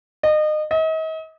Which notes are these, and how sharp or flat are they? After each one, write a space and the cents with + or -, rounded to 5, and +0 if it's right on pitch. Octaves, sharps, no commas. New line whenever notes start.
D#5 -30
D#5 +40